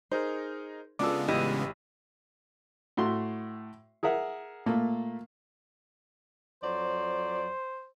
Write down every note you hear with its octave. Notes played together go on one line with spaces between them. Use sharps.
D#4 G#4 A#4 C5
C#3 G#3 B3 D4 F4 A4 D6 E6
A1 E4 G4 D#5
A2 A3 F#4 C6
G#4 A#4 E5 F#5
A#2 A3 A#3
F2 F#3 C5 D5